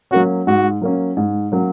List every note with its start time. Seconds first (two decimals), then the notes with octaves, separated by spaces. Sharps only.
0.11 F#3 A#3 C#4 F#4
0.47 G#2 F#4
0.82 F#3 A#3 C#4
1.17 G#2
1.52 F#3 A#3 C#4